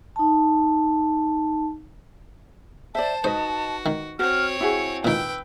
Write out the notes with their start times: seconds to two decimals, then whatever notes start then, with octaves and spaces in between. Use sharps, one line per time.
0.16 D#4 A5
2.95 C5 D5 E5 A5
3.24 D#4 F#4 B4 C5 D#5
3.86 D#3
4.19 C4 F#4 C#5 F6
4.61 E4 F#4 G#4 C#7
5.05 A#2 D#3 B4 G5 E6